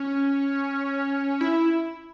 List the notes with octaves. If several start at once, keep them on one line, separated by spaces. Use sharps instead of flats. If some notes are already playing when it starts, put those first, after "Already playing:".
Already playing: C#4
E4